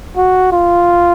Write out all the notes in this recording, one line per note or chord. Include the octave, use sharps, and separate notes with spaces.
F#4
F4